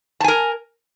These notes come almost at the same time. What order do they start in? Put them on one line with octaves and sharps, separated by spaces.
A5 G#5 A#4